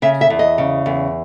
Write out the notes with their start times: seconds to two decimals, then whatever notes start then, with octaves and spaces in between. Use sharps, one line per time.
0.02 C#3 E5
0.21 E5
0.30 E2
0.39 D#5
0.58 C#3
0.86 E2